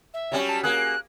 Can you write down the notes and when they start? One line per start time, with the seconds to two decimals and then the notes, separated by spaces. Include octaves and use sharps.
0.14 E5
0.32 F#3 G3 C#4
0.49 A5
0.63 A#3 G#4 F#6